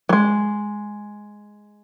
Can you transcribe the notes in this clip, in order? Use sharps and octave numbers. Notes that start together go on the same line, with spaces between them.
F#3
G#3